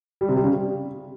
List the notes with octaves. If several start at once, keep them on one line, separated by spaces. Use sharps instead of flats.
G3
C3
G3
C#3
G3